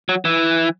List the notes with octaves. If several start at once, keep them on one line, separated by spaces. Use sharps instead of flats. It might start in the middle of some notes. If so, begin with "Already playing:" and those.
F#3
E3